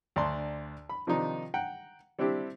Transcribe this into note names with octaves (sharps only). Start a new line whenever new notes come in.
D2 D4 D5 A5 A#5 C6
B5
C3 D#3 F3 D4 D#4
F#5 G5 A#5
G3 C4 D4 E4 G4